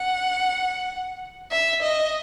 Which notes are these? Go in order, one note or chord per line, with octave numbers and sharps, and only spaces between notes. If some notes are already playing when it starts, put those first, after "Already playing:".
Already playing: F#5
E5
D#5